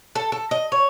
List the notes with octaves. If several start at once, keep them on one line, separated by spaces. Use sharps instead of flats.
A4
A4
D#5
C#5